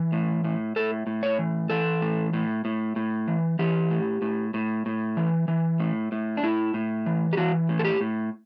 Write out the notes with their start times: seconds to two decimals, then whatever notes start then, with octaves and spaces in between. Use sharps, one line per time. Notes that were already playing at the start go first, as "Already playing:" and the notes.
Already playing: E3
0.12 A2
0.44 A2
0.76 A2 A4
1.07 A2
1.23 C#5
1.39 E3
1.69 E3 A4
2.02 A2
2.33 A2
2.65 A2
2.96 A2
3.28 E3
3.59 E3 G4
3.90 A2
4.22 A2
4.54 A2
4.86 A2
5.17 E3
5.48 E3
5.80 A2
6.12 A2
6.37 D4
6.43 A2 E4
6.74 A2
7.06 E3
7.33 G4
7.37 E3 F#4
7.69 A2
7.79 A4
7.85 G4
8.01 A2